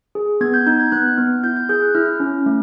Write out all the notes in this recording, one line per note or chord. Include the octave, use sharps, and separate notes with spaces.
G#4
B3 G#6
G6
D#4 G6
G#6
B3 F#6
B3 F6
E4 G6
G6
G#4 G6
F#6
E4 F6
C#4
A3